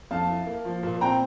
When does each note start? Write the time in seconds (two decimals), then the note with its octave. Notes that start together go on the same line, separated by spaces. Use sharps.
0.11 F2 F5 A5
0.29 E4
0.46 A#3
0.65 F3
0.83 A#2
1.01 C4 G5 A#5